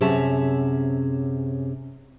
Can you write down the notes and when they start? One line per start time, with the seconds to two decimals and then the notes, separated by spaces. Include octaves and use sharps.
0.01 F#2 C3 C#4 G#4 E5 A5